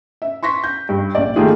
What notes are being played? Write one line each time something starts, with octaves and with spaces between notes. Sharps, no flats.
E5
C6 C#6 A#6 B6
G6
G2
A#1 D5
D#3 A3 A#3 F4 G4 G#4